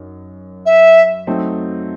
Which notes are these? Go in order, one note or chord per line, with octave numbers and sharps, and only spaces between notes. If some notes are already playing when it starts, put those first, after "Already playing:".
Already playing: F#2 D#4
E5
F#3 A3 C4 D#4